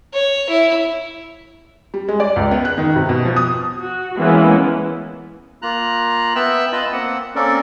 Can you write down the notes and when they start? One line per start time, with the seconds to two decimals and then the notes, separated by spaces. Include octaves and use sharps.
0.13 C#5
0.49 E4
1.94 G3
2.08 G#3
2.20 D5
2.36 C#2
2.51 B3
2.65 F#6
2.78 D#3
2.96 C3
3.09 B2
3.25 F3
3.36 D#6
3.80 F#4
4.17 E3 G#3 A#3 B3 C#4 E4
5.62 A#3 F4 A#5 F#6
6.35 B3 E5 G5 E6 F#6
6.72 F4 B4 D#5 A5 B5
6.92 A#3 C4 F#5
7.35 A#3 C4 C#4 A4 A#4 D5